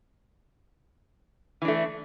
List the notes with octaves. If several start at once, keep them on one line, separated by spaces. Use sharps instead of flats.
E3 A3 D4